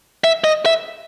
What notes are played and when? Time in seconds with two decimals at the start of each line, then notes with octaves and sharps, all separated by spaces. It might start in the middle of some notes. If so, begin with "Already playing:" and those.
0.24 E5
0.44 D#5
0.66 E5